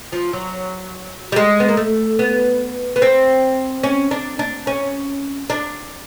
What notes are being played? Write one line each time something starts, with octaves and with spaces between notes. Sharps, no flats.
F3
F#3
G3
G#3
B3
A#3
A3
B3
B3
C4
C#4
D4
D4
C#4
D4